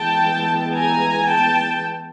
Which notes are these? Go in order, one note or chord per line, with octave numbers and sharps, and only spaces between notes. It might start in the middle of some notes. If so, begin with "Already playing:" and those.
Already playing: E3 G#3 B3 G5 A5
G#5 A#5
G5 A5